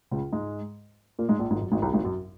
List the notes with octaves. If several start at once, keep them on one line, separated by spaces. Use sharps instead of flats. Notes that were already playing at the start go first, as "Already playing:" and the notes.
C#2 C#3
G#2 G#3
A#2 A#3
G#2 G#3
A#1 A#2
G#1 G#2
F#2
G#1 G#2
C2 C3
G#1 G#2
F#2